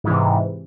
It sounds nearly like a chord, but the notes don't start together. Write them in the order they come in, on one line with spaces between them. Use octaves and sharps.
G#2 E3 C3